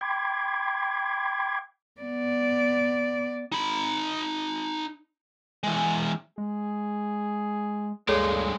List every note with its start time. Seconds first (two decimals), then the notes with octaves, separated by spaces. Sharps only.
0.01 G5 B5 C6 D6 G#6
2.01 B3 D5
3.52 D#4 B5
5.63 E3 G#3
6.38 G#3 G#4
8.09 D2 G2 G#3 A#3 G#4 A4 C#5